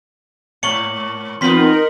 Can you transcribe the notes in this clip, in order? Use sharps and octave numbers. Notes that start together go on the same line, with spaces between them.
G#2 A#3 C#5 A5 C#7 F#7 G7
E2 B3 D#4 F4 A#4 C6 B6 F#7